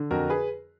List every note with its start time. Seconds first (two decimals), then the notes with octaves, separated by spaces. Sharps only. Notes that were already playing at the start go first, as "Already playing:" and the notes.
Already playing: D3
0.11 F2 F#4 A#4
0.30 G#4 B4